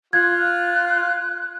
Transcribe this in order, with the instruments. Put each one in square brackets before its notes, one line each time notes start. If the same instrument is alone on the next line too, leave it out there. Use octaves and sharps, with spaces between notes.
[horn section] F4 [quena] F#6 [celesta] G#6